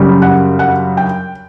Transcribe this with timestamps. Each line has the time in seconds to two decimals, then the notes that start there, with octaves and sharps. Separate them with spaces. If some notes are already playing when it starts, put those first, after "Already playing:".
Already playing: F#2 C#3 G3
0.22 F#5
0.59 F#5
0.97 G5